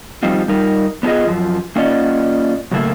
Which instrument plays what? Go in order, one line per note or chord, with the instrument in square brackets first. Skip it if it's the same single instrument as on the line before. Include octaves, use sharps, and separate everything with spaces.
[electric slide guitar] F3 G3 C4 D#4 F4
G3 D#4 A#4
B3 D4 F4 G#4 D#5
F#2 F3
A#3 C#4 F4 D5 D#5 F#5
F#2 A2 C#3 A3 A#3 E4